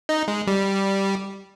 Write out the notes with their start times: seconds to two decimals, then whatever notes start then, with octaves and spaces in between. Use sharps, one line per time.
0.09 D#4
0.28 G#3
0.47 G3